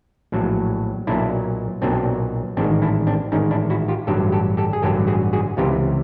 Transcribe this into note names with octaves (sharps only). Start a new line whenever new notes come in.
A#1 A2 F#3
B1 A#2 F#3 D4 E4
B1 A#2 F#3 C4 D4
A1 G#2 D#3 C4 D4
D4 E4
C4 D4
A1 G#2 D#3 C#4 D#4
D4 E4
E4 F#4
F4 G4
A1 G2 D3 F#3 G4 A4
G4 A4
G4 A4
G#4
A1 G2 D3 F#3 G4 A4
F#4 G#4
F#4 G#4
C#2 C3 E3 F4 G4